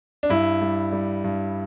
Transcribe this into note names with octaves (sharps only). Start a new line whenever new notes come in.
D4
G2 E4
G3
G3
G2